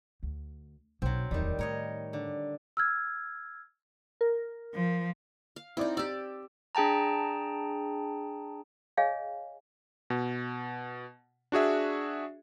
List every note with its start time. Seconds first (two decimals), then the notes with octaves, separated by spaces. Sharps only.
0.23 D2
1.02 B1 F#3 C4
1.31 D1 E2 D#3 G3
1.59 A2 A#4 C#5 D#5
2.13 D3
2.77 E6 F6 G#6
4.21 A#4
4.74 F3
5.56 F5
5.77 C4 D#4 E4 D5
5.97 G4 D5 E6
6.75 D4 G#4 G5 A5 A#5
8.97 G#4 C#5 D#5 F5 G#5
10.10 B2
11.52 D4 F#4 G#4 E5